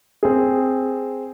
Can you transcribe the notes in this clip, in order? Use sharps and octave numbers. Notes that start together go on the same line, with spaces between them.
C4 G#4